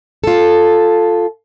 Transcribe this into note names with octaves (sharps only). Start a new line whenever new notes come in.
F4 A4